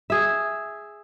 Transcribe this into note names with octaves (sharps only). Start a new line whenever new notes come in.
G#4 E5